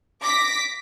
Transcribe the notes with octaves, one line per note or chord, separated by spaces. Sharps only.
D6 A#6 B6